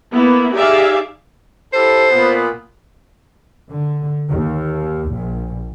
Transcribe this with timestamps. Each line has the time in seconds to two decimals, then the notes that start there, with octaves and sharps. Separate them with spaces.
0.13 A#3 B3 E4
0.54 D#4 G4 G#4 D5 E5 F5
1.73 E4 G4 A4 C5
2.12 A#2 B3
3.69 D3
4.31 D#2
5.13 A#1